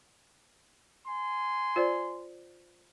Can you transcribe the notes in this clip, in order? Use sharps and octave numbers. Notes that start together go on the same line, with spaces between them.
G#5 C6
F4 C5 D5